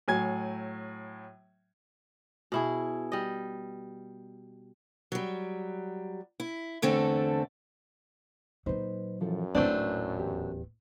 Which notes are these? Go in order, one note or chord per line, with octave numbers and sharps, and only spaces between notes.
A2 F#3 G#5 G#6
B2 E4 G#4
G3 D#5
F#3 G3
E4
E2 D3 A3 C4 A4
A#2 F#3 D#4 B4 C5
F#2 E3 F3 A4
D#1 A2 A3 C4 D4 B4
E2 G4